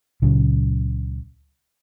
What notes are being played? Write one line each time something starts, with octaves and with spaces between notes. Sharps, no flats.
C#2 A#2 C#3 F#3